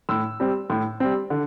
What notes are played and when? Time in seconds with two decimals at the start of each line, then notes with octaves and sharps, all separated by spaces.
0.09 A2 E6
0.40 G3 C4
0.70 A2
1.00 G3 C4
1.30 D3